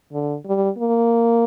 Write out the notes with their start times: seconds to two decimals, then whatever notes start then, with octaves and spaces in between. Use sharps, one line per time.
0.13 D3
0.46 G3
0.78 A#3